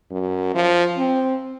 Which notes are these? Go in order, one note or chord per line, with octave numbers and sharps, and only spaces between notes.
F#2
F3
C4